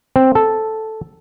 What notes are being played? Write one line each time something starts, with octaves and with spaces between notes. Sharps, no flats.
C4
A4